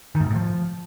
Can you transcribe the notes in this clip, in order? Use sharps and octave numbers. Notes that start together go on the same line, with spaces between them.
D#3
G#2
B2
A2
F3